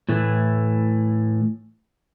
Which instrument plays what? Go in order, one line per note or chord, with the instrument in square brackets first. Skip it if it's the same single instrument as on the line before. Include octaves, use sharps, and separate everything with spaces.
[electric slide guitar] A2 E3 A3